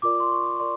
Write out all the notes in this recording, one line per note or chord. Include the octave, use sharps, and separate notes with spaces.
F4 A#4 D5 D6
C6
C#6
A#4 D5 C6